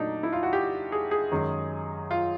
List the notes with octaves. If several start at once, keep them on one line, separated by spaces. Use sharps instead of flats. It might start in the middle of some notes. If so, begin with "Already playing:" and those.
Already playing: A#2 F#3 A3 D4 D#4
E4
F4
F#4
G4
G#4
G#4
F#2 D#3 G#3
F4